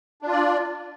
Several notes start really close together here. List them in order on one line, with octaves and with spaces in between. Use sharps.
D4 F4 D5